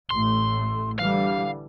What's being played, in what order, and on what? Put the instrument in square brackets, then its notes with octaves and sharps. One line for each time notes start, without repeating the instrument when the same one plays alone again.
[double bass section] A1 A2 A3 [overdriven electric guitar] C6
[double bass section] D3 E3 G3 [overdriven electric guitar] F5